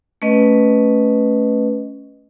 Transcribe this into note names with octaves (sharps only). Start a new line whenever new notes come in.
A3 C#4 B4 D#5